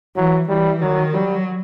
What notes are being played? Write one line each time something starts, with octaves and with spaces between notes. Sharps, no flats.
E3 F#3
E3 G3
D#3 F#3
F#3 G3